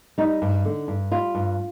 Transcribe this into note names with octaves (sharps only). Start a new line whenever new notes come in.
G3 D#4
G2
D3
G2
G3 F4
G2